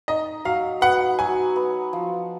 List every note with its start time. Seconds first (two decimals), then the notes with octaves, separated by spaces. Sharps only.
0.08 D#4 D#5
0.45 F#3 F5
0.81 B3 F#5
1.19 F#3 G#5
1.56 B3
1.93 F3